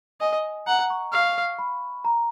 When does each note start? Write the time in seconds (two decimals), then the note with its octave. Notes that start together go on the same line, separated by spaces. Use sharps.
0.21 D#5 G#5
0.67 F#5 A#5
0.90 C#6
1.13 F5 C#6
1.59 B5
2.05 A#5